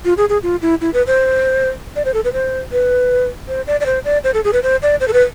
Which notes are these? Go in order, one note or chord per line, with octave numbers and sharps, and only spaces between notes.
F4
G#4
G#4
F4
E4
E4
B4
C5
D5
C5
A4
B4
C5
B4
C5
D5
D5
C5
D5
C5
A4
G#4
B4
C5
D5
C5
A4
B4